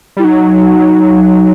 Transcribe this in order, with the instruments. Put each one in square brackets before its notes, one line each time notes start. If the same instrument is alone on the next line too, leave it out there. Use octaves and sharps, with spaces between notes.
[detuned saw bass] G3 [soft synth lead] E4
[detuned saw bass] F#3 [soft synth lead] D#4